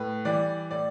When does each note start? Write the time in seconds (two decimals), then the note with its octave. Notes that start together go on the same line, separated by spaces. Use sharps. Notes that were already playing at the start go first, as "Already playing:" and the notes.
Already playing: A2 B4
0.25 E3 G3 D5
0.71 A2 D5